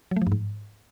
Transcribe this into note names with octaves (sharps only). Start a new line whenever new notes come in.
F#3
A3
F3
G2
G#2